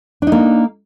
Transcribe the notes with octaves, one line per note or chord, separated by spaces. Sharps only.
A#3 D4 D#4